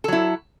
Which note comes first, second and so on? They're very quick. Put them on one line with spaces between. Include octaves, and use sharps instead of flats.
A4 F#3 E4